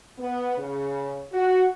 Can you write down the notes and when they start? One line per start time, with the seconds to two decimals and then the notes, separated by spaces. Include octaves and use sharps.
0.19 B3
0.58 C#3
1.32 F#4